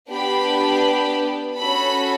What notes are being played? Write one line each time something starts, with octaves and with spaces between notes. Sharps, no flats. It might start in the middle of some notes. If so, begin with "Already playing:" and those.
B3 D4 G4 B5
C#4 F#4 A4 B5